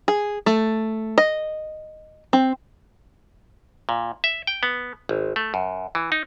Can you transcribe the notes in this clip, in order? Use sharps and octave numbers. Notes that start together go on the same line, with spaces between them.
G#4
A3
D#5
C4
A#2
E5
G5
B3
G#1
A3
F#2
E3
D#4